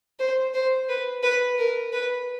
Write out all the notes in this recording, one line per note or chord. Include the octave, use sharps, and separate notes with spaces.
C5
C5
B4
B4
A#4
B4